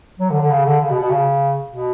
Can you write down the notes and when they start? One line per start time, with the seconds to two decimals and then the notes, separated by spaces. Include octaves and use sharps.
0.19 F#3
0.30 D3
0.40 D3
0.50 C#3
0.64 D3
0.80 C#3
0.89 B2
0.99 B2
1.09 C#3
1.69 B2